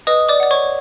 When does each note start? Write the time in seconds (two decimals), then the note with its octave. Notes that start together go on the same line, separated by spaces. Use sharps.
0.07 B4 D#5 D#6
0.29 D5 D6
0.40 D5 F#5
0.51 C#5 C#6